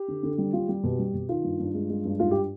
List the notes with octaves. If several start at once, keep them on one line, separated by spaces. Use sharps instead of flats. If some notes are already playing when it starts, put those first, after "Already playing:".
Already playing: G4
D3
D3
G3
G3 F4
G3 G4
B2
G3
B2
D#3 F4
G2
G2
G#3
G#3
G2
G#2 F4
G4